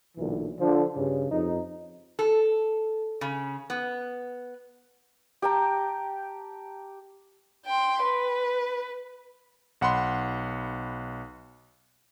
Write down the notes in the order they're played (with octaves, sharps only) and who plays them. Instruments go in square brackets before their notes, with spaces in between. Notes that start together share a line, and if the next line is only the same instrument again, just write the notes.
[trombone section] B1 A#2 D3 E3
D3 F3
G2 C#3
F2 D#4
[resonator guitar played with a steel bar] A4
C#3
B3
[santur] G4 G5 A5 A#5
[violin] G5 C6
B4
[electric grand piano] B1 F#5 B5 C6